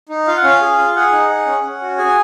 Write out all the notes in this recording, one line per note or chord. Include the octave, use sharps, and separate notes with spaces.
D#4
F4 F5
F#5
C#4 F5
G#4
F4
G#4 F#5
D#4
G#4
C#4
C#4
F#4
G#4 G#5